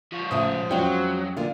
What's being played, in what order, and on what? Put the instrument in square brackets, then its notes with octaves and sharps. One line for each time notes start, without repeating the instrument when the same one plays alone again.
[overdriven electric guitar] F3 C#5 [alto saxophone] F4
[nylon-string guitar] A2 C#3 A3 [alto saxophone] C5 [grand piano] D#6
[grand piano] F2 C#4 G5 [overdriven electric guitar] F#3 [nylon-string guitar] G#3 F4
[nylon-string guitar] D3 A#3 [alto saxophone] F4